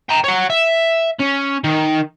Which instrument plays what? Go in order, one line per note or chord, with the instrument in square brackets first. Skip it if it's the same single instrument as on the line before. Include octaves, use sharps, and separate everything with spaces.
[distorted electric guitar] G5 A#5
C#5 F#5
E5
C#4
D#3